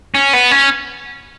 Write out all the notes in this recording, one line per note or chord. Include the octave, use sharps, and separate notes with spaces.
C#4
B3
C#4